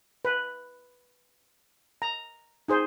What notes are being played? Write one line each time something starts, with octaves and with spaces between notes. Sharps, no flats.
B4
A#5
D#4 G#4 C5